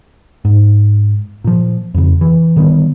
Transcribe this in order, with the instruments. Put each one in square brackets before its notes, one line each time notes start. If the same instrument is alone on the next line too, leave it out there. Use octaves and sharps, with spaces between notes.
[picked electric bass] G#2
A#2 F3
F2 C#3
E3
D3 D#3 G3 B3